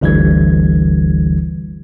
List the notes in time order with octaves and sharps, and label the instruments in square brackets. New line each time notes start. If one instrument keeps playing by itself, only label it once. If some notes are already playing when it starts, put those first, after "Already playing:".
[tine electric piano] G1 D2 D3 E3 G3 G#6